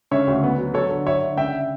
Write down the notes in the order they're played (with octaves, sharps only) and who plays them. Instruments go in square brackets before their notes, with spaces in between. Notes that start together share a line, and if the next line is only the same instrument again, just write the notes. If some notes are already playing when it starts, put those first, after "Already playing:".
[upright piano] C#3 [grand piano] C#5 E5
[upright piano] D2
B3
F#3
[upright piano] F#3 [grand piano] A4 C#5
[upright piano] D3
[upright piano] F#3 [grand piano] C#5 E5
[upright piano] D3
[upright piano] C#3 [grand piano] E5 G5